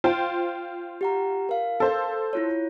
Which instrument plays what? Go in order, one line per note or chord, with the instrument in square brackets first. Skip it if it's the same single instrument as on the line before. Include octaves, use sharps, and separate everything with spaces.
[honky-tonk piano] F4 C5 G5
[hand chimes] G4 F#5 A#5
A#4 F5
[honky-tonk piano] A4 C5
[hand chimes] E4 F4 C#5